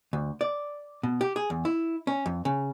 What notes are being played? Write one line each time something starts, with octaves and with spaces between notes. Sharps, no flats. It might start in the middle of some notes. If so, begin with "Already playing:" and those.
D2
D5
B2
G4
G#4
E2
E4
C#4
F2
C#3